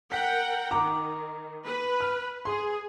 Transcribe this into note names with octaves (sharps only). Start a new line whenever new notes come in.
A#4 F#5 G5 B6
D#3 A#5 D6
B4
F6
G#4 C6